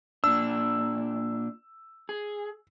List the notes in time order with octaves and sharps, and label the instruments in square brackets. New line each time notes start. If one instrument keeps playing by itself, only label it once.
[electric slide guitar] A#2 D4 [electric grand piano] E6
[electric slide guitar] G#4